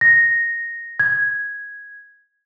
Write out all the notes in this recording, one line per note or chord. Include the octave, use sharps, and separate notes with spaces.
A#6
G#6